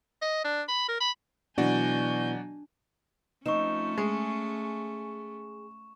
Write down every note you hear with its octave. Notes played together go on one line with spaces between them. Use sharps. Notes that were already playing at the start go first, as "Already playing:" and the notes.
D#5
D4
B5
A#4
B5
B2 E3 F#3 D4 F#4 D5 G#5 G6
F3 A3 C4 C#4 D#4 C#6 E7
G#3 G#4